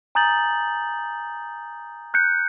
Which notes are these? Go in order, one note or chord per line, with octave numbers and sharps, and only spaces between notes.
G#5 A#5 D#6 G6 A6 F#7
F#6 G6 C#7